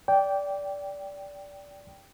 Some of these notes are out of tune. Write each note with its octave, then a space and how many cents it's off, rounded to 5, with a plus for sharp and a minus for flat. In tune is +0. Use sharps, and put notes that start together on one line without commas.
D5 -20 G5 +0